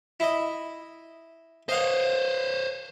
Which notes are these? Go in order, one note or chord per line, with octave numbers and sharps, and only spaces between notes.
E4 D#5
C5 C#5 D#5 F5 F#5